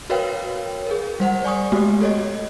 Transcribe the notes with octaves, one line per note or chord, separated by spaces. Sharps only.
F#4 A#4 B4 C#5 F5 G5
G#4 A#4
G3 C5 F#5
D5 G#5 C#6 D#6
G#3 A3 B3 F#4 G4
A4 C#5 D#5